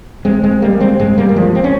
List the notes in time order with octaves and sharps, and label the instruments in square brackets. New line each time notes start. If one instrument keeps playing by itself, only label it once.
[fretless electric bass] G#3 C4
G#3 C4
G3 A#3
G#3 C4
G2 G#3 C4
G3 A#3
A#3
F3 G#3
C4
C#4